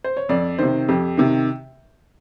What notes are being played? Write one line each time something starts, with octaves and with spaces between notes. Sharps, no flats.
C5
C#5
F2 D5
C3 D#3 C5
F2 G4
C3 D#3